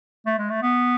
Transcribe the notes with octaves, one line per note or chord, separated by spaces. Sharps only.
A3
G#3
A3
B3